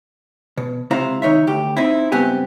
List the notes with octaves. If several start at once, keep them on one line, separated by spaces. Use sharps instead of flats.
B2
C#2 C3 E4 C5 F5 A#5
D#3 D#4 C#5 E5
D2 G4
C4 D#4 E4
C#2 G2 B3 C4 G4 G#5